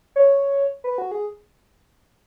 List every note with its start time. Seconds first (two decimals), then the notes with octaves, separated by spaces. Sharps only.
0.16 C#5
0.84 B4
0.98 F#4
1.11 G#4